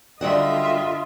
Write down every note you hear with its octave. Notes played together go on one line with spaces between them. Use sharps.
F#2 D3 G3 F4 D#5 E5 F#5